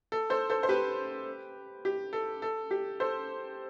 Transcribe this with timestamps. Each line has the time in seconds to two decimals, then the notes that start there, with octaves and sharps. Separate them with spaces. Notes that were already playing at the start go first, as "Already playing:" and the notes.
0.12 A4
0.30 A4 C5
0.50 A4 C5
0.63 C5
0.69 G4 B4
1.85 G4
2.13 A4
2.42 A4
2.71 G4
3.00 A4 C5